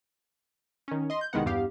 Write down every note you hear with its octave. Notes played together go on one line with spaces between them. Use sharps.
D#3 C#4
D#5 C6
G6
C2 D#3 G#3 B3 F#5
E2 G2 B3 G4 F5